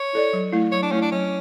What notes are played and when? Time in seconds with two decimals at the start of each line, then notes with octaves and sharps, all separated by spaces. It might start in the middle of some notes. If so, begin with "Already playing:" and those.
Already playing: C#5
0.13 E4 A4 D5
0.33 F#3
0.53 A3 E4
0.72 F#3 C#5
0.83 D4
0.91 A3 C#4 E4
1.02 D4
1.12 F#3 C#4